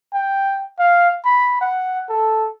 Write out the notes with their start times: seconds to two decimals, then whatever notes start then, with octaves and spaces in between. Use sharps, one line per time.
0.13 G5
0.79 F5
1.25 B5
1.61 F#5
2.09 A4